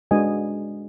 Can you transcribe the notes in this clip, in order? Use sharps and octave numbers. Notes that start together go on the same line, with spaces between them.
G#3 D4 F#4 B4 D#5 G#5